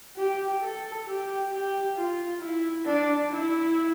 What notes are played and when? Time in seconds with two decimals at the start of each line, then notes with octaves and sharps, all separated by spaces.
0.17 G4
0.62 A4
1.06 G4
1.51 G4
1.96 F4
2.40 E4
2.85 D4
3.30 E4